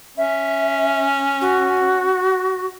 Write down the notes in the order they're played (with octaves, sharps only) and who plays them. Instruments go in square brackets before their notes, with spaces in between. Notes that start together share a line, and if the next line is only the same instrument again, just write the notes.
[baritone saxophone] C#4 [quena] E5
[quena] F#4